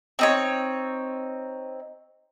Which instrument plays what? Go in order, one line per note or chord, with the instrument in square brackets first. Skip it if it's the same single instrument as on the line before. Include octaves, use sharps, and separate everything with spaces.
[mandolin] C4 D#4 C#5